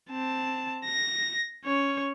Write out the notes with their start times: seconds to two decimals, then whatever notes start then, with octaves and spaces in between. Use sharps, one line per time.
0.11 C4 A5
0.85 A#6
1.65 C#4 C#5